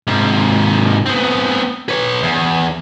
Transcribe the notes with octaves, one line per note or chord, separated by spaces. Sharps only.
G#2 C3
B3 C4
B4 C#5
E2